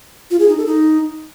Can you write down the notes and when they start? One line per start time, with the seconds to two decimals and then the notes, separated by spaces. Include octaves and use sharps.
0.31 F4
0.40 G#4
0.48 D#4
0.57 A4
0.66 D#4